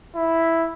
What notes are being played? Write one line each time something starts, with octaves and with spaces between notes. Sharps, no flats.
E4